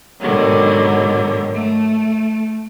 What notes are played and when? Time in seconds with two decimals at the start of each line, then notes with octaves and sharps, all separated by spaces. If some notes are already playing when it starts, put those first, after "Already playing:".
0.20 G#2 B2 D3 D#3 F#3
1.54 A3